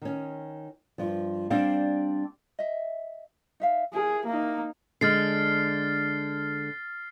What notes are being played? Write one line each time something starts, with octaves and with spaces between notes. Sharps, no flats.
D#3 C#4
G2 F3
G3 C4 D4 D5 F5
D#5 E5
D#4 E5 F5
E4 G#4 A#4
A#3 D#4
D3 G#3 F6 A6 C7